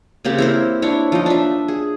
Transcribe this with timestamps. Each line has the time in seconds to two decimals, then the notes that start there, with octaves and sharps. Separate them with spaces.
0.25 C#3 A#3 C4 G4
0.38 E4 A#4 C5
0.82 D4 E4 C#5
1.12 F3 D#4
1.26 D4 E5
1.68 G#4